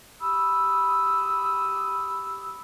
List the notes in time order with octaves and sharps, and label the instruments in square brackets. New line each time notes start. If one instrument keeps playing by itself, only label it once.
[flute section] G4 B5 D#6 E6